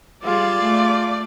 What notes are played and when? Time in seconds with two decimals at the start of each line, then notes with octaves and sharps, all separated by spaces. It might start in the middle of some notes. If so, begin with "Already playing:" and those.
0.24 G3 F4 G#4 D5
0.62 A3